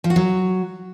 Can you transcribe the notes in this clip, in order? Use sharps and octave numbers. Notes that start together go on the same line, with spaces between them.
F3
F#4
F#3